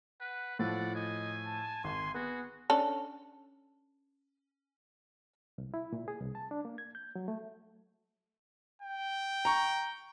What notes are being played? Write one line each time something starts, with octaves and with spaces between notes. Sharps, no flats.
B4 F#5
A2 F3 D5 F#5
D#5 G#5
A5
G#1 C6
B3 F#4 G#4
C#4 D4 A4
C2
E4
A#2
G#4
C2
A5
D4
A#3
G#6
G6
F#3
A3
G5
A#5 C#6